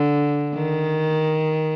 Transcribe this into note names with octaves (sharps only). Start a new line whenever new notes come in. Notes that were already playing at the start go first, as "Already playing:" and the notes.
Already playing: D3
D#3